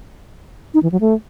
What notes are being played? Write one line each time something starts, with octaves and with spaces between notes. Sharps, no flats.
D#4
E3
F#3
A3